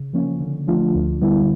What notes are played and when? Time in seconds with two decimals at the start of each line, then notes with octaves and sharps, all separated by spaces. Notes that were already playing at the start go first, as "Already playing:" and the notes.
Already playing: C#3
0.13 F3 A#3 C#4
0.40 D3
0.67 F3 A3 D4 F4
0.95 D2
1.21 D3 G3 B3 E4